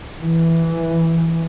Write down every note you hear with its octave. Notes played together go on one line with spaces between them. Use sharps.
E3